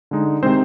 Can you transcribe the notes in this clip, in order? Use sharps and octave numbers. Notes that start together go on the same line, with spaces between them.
D3 G#3 D#4
C3 D#3 G#3 C4 C5